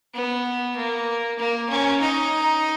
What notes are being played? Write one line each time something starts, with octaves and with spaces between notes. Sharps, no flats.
B3
A#3
A#3
C#4
D#4